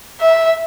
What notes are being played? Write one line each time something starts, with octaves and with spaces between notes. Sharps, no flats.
E5